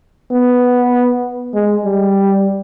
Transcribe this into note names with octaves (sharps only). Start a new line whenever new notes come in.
B3
G#3
G3